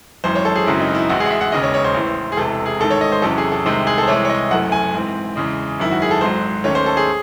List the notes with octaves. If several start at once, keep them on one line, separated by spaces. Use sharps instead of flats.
G#1 F#2 E3 C5
C#5
A4
G#4
G#1 F#2 C#3 F#3 C4 E4
D#4
E4
A1 A2 G#3 F#4
G#4
F#5
E5
F#5
E1 D#2 C#3 D#5
C#5
C#5
C5
A1 A2 E3
G#4
E1 E2 C3 A4
G#4
A1 G#2 D#3 A4
C#5
D#5
C5
E2 C3 F#3 C#4 A4
G#4
A4
C2 C3 D#3 G#3 C5
G#4
A4 C5
C2 C3 E3 G#3 C#5
C#5
D#5
F#1 F#2 E3 A3 F#5
G#5
G#2 E3 C4
E2 C#3 G#3
G#1 F#2 D#3 E4
F#4
G#4
A4
G#1 G#2 F#3 C5
D#2 D#3 A3 C#4 C#5
C5
A4
G#4